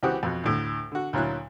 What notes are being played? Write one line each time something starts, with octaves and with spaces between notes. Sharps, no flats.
C#2 E3 C4 F#4 G4 D#6
F2 B2
D2 A2 D3
D3 F#4
D2 A#2 F#3 E4 F#6